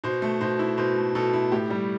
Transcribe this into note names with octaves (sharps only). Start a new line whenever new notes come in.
B2 C5
A3
B2 C5
E4
B2 C5
A3
B2 A4
E4
A2 G4
G3